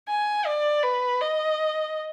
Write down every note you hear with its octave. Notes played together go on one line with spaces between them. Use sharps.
G#5
D5
B4
D#5